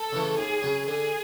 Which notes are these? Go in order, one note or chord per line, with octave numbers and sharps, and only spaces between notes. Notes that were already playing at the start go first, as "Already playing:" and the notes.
Already playing: A4
C#3 E3 A3
D#2 G#4
C#3 F#3
D3 G#4